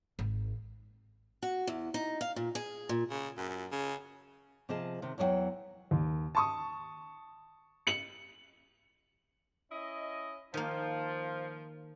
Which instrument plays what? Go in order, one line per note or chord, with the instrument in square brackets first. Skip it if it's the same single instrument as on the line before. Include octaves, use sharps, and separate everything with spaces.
[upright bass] G#1
[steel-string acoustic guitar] F#4
E2
D#4
F5
A#2
G#4
A#2
[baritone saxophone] C#3
F#2
C#3
[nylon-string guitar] C3 F3 G#4 D#5 F5 A5
C3 D#3
E2 E3 F#3 D#5 F#5 G5
[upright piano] D#2
A5 C#6 D#6
C#7 F#7
[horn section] C#4 E4 D#5
[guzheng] D#3 A#3 [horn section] F3